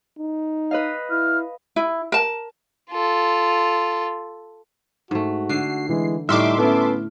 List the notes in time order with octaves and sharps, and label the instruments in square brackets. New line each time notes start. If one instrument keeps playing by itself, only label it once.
[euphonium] D#4
[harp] B4 D#5 F5
[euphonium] E4 [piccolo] F6
[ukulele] E4
A#4 A5
[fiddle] F4 A4
[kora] G#2 A3 [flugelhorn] F#4
[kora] D3 [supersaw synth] C7
[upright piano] E3 [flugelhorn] G#3
[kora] A2 A3 [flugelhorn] G3 [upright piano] D#4 F6 [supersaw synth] E5 C6 D6
[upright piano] B3 C#4 [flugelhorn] A4